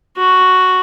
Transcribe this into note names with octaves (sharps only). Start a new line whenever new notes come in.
F#4